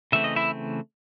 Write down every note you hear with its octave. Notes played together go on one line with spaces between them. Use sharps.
C#3 E3 A3 C4 E5
D#5
E4 E5